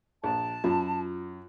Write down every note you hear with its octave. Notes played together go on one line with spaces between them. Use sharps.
A#1 A5
F#2 F4